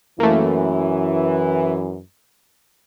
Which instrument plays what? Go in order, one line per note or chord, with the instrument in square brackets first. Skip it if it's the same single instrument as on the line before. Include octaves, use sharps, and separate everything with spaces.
[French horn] F#2 [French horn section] E3 [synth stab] A3 A#3